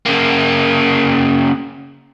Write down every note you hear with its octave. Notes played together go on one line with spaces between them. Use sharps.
C#3 A#3